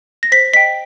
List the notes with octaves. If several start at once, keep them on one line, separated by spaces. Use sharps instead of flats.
A#6
C5 B6
D#5 G5 B6